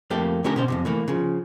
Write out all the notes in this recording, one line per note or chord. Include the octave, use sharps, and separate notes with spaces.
F2 A3 A#3 G4
D3 A3 C#4 G4 A#4
B2 C#4 C5
F2 A2 C3
E3 A3 A#3
C#3 F3